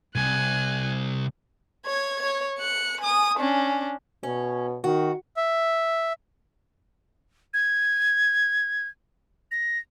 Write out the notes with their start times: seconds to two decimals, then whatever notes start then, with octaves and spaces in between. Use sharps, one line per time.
0.15 C2 G#5 F#6
1.86 C#5 G#6
2.23 C#5
2.59 F#6 C#7
3.01 G#5 D#6
3.38 C#4 D4
4.23 B2 C#4
4.84 D#3 F#4
5.37 E5
7.54 G#6
9.51 A#6